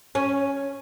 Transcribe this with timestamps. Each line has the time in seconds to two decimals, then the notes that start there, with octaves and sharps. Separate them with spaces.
0.15 C#4